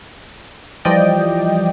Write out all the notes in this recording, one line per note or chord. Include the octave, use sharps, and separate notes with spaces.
E3 F3 G3 D5 D#5 G5